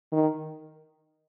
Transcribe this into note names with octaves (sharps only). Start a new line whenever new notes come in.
D#3